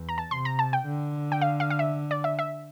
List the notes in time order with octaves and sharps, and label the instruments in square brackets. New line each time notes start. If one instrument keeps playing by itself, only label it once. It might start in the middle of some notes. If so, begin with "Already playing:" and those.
Already playing: [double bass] E2
[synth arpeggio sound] A#5
A5
[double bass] C3 [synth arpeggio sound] C6
[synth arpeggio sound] A#5
A5
G5
[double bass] D3
[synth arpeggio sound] G5
F5
F5
F5
E5
D5
E5
E5